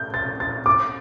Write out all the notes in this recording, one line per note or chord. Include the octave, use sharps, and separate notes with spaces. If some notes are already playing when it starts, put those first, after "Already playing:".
Already playing: G6
A6
A6
D6